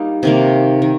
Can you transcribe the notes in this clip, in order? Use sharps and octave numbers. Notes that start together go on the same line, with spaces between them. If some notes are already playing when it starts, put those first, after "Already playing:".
Already playing: G3 A#3 D#4 F4
C3 D#3 A#3
D#3